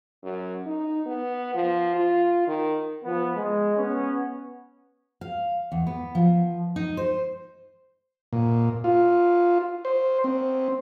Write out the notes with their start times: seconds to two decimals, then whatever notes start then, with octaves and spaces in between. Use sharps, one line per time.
0.23 F#2
0.66 D#4
1.06 B3
1.54 F3
1.95 F4
2.47 D#3
3.04 F3 B3
3.36 G#3
3.77 B3 C#4
5.21 F5
5.72 E2
5.87 B3
6.15 F3
6.76 D#4
6.97 C5
8.33 A#2
8.84 F4
9.85 C5
10.24 C4